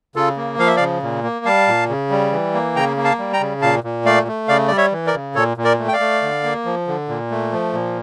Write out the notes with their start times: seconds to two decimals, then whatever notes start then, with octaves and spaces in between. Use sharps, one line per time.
0.15 C#3 F4 A4
0.37 A#3
0.58 F3 F5
0.67 E5
0.77 D5 F5
0.80 C#3
1.02 A#2
1.23 A#3
1.45 G3 F5 A5
1.68 A#2
1.89 C#3
2.10 G3
2.32 E3
2.54 A#3
2.76 C#3 G5 A#5
2.97 A#3
3.04 F5 A5
3.18 G3
3.33 G5 A#5
3.40 C#3
3.62 A#2 F5 A5
3.84 A#2
4.05 A3 D5 F5
4.27 A3
4.48 C#3 D5 F5
4.68 G3 D5
4.77 C#5 E5
4.92 E3
5.07 A#4 D5
5.14 C#3
5.35 A#2 A4 C#5
5.57 A#2
5.64 A#4 D5
5.79 A3
5.88 G5
5.93 D5 F5
6.00 A3
6.22 D3
6.44 A#3
6.65 F3
6.88 D3
7.08 A#2
7.31 A3
7.53 F3
7.73 A#2